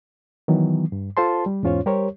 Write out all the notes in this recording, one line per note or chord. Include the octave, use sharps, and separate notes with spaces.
D#3 E3 F#3 B3
G2
F4 A4 C5 A5 C6
G3
E2 G#2 C#4 F4 C5 C#5
G3 G4 A#4 C5 C#5